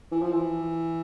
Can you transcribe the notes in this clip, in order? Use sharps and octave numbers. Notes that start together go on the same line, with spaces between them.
E3
F3
E3